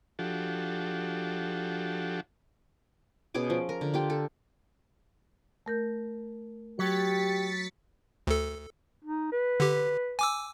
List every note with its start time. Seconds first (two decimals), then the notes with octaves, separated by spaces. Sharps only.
0.19 F3 D4 F#4 G4 A4
3.34 B2 C#4 G#4 D6
3.50 F3
3.69 A#4
3.81 D3
3.94 F4 G4 G5
4.10 A4
5.66 A3 A#4 G6
6.79 F#3 G4 A6 B6 C#7
8.27 D2 A4
9.04 D#4
9.32 B4
9.60 D3 G4
10.19 G#5 D6 E6